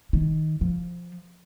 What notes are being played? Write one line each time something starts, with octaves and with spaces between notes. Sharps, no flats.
D#3
F3